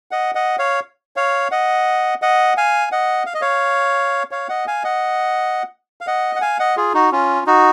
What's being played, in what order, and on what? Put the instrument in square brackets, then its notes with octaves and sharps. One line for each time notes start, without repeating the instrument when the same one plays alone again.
[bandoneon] D#5 F#5
D#5 F#5
C#5 F5
C#5 F5
D#5 F#5
D#5 F#5
F5 G#5
D#5 F#5
F5
D#5
C#5 F5
C#5 F5
D#5 F#5
F5 G#5
D#5 F#5
F5
D#5 F#5
F#5
F5 G#5
D#5 F#5
F4 G#4
D#4 F#4
C#4 F4
D#4 F#4